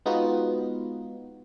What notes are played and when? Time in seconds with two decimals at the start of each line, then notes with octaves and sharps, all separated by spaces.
0.06 G#3 B3 D#4 F4 F#4